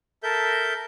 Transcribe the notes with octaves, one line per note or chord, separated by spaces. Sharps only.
A4 A#4 E5 G6